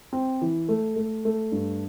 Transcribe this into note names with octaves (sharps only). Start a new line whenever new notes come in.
C4
E3
A3
A3
A3
G2